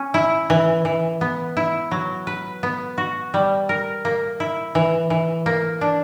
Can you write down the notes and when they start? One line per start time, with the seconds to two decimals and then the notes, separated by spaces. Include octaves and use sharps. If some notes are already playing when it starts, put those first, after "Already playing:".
Already playing: C#4
0.14 E4
0.50 E3
0.85 E3
1.21 B3
1.57 E4
1.91 F#3
2.27 B4
2.63 B3
2.98 F#4
3.34 G3
3.69 A#4
4.05 A#3
4.40 E4
4.75 E3
5.10 E3
5.46 A#3
5.81 D4